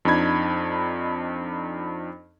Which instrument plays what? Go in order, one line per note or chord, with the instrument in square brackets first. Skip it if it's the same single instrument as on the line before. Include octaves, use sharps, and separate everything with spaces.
[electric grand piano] F2 D4 D#4 B5 G#6